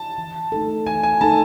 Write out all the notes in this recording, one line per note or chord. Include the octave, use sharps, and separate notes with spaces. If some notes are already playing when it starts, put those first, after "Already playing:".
Already playing: A5
E3
A3 D#4 A4
E3 G#5
G#5
A3 D#4 A4 A5